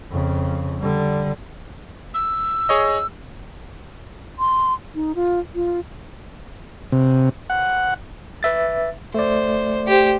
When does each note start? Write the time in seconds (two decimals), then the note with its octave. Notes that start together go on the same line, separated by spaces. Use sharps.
0.11 F2 C#3
0.80 D3 G3
2.14 E6
2.69 G#4 C#5 D#5
4.39 C6
4.95 D#4
5.15 F4
5.55 F4
6.92 C3
7.50 F#5
8.43 B4 E5 A6
9.14 A3 C5 D5
9.88 G4 C5